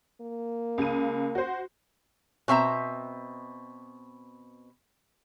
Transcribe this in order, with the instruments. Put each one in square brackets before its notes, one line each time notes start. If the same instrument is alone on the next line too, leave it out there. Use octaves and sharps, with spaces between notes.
[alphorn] A#3
[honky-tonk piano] C#2 D#7
F#4 C5
[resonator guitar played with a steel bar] B2 C4 E5 A#5